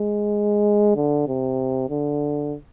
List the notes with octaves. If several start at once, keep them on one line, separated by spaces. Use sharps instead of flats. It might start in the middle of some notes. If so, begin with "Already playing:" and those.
Already playing: G#3
D3
C3
D3